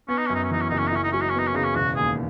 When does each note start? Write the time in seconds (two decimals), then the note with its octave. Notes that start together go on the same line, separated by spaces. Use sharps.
0.09 B3 C#4
0.17 D#4
0.26 C#4
0.30 F#2 D#4
0.44 C#4
0.51 E3 D#4
0.61 C#4
0.69 F#1 D#4
0.78 C#4
0.87 D#4
0.92 C#4 E4
1.04 D#4
1.12 F#3 C#4
1.21 D#4
1.29 C#4
1.34 B3 D#4
1.47 C#4
1.54 C#3 D#4
1.64 C#4
1.75 E1 F#4
1.96 D#2 G#4